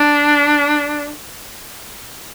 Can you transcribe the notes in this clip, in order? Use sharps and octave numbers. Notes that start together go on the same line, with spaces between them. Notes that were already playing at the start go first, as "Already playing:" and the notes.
Already playing: D4